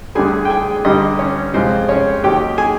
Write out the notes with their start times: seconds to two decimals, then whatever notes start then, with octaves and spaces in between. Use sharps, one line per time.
0.15 D2 D3 G3 G#4 G#5
0.45 G5
0.50 G#4 G#5
0.85 G2 D3 G3 D#4 D#5
1.19 C#4 C#5
1.54 F2 C3 F3 G#3 C4 C5
1.89 C#4 C#5
2.23 D#2 D#3 F#3 G4 G5
2.58 G#4 G#5